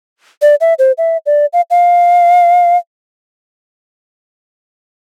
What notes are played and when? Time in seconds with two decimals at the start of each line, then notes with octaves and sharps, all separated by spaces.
0.42 D5
0.61 E5
0.79 C5
0.98 E5
1.26 D5
1.53 F5
1.71 F5